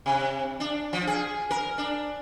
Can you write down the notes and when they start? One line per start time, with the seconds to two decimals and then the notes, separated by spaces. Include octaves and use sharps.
0.06 C3
0.60 D4
0.93 F3
1.07 G#4
1.51 A#4
1.78 D4